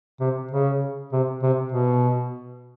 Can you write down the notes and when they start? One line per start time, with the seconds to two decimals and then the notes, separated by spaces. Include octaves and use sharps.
0.20 C3
0.51 C#3
1.12 C3
1.43 C3
1.72 B2